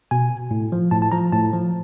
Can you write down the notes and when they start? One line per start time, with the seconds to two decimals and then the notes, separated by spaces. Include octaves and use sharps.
0.11 B2 G#5
0.51 A2
0.72 F3
0.91 A2 A5
1.02 A5
1.12 F3 A#5
1.32 A2 A5
1.53 F3